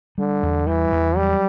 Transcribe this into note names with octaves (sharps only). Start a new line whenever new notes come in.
D3 G3
E2
E3 G3
E2
F#3 G3